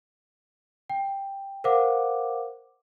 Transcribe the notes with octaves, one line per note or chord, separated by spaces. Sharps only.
G5
A#4 C5 F5 F#5 D6